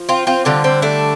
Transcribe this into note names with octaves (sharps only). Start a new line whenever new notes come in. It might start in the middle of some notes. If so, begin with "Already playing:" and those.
Already playing: F3
C4 F4
C4 F4
D3 G3 C4 F4
C4
A3 D4